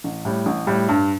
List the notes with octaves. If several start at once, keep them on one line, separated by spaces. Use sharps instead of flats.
A1
A2 G3
A1
A2 G3
G2